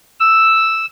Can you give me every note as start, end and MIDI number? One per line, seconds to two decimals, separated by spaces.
0.20 0.86 88